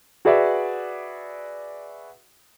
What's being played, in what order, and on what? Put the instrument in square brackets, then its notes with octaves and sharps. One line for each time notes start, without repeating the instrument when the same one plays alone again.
[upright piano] F#4 G#4 B4 D5 E5